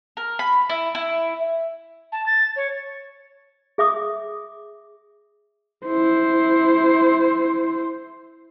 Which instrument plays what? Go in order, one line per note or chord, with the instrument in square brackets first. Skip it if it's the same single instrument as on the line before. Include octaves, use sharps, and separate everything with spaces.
[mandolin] A#4
B5
E4
E4
[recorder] A5
A6
C#5
[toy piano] G#4 E5 D6 D#6
[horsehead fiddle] E4 C5